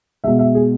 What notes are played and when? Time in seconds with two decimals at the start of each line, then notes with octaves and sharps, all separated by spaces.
0.24 B2 G#3 E5
0.39 E5
0.55 G#4